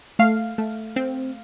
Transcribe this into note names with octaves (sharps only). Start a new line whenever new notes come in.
A3 F5
A3
C4